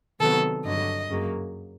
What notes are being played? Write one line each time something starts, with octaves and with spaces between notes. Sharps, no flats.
C3 D#3 F#3 B3 A4
G2 D3 F#3 D#5
F#2 C#3 F#3 A#3